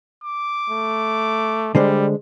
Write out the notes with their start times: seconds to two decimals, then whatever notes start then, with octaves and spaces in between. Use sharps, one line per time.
0.24 D6
0.70 A3
1.75 D3 G3 G#3 C5